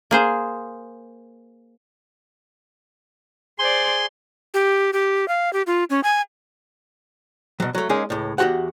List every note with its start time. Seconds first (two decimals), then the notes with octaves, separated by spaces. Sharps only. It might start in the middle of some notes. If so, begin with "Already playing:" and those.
0.11 A#3 G#4 C5
3.59 G#4 C5 D5 G#5 C6
4.54 G4
4.93 G4
5.28 F5
5.53 G4
5.67 F4
5.90 C#4
6.04 G#5
7.60 B2 F#3
7.75 F#3 A3
7.89 G#3 A#3 C#4 D#4 G#4
8.10 C#2 A2
8.38 E2 D3 F#4 G4 F#5